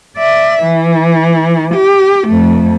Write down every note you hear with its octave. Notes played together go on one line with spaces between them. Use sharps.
D5 E5
E3
G4
F2 A3